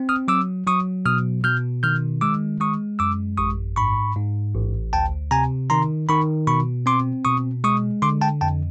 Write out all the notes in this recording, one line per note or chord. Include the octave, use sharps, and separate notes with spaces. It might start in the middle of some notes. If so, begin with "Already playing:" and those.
Already playing: C4
D#6 F6
F#3 D6 E6
F#3 C#6 D#6
B2 D#6 F6
B2 F6 G6
D#3 F6 G6
G#3 D6 E6
G#3 C#6 D#6
F#2 D6 E6
A1 C#6 D#6
G#2 B5 C#6
G#2
A1
D2 G5 A5
C3 G#5 A#5
D#3 A#5 C6
D#3 B5 C#6
B2 B5 C#6
C4 C6 D6
B2 C#6 D#6
G#3 C#6 D#6
D3 C6 D6
G5 A5
F2 G5 A5